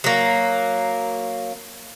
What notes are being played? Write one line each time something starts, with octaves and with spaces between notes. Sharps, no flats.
F#3 A#3